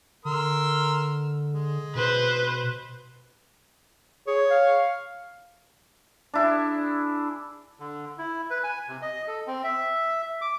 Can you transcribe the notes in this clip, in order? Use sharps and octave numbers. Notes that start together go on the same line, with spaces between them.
D3 A#4 C6 E6
G#3
B2 B4 C5
G#4 C#5
F5
D4 E4 G#4
D3
E4
B4
G#5
C3
D#5
A4
C4
E5
D6